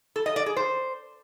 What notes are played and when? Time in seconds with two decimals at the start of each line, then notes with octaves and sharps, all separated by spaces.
0.16 A4
0.26 D#5
0.36 D5
0.46 G#4
0.57 C5